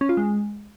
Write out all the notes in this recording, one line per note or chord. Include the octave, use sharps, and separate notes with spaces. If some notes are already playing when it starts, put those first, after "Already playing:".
C#4
F4
G#3